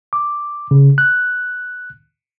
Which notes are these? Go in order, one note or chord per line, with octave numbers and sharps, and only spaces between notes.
D6
C#3
F#6